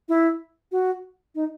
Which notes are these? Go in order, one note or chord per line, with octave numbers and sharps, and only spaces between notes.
E4
F#4
D#4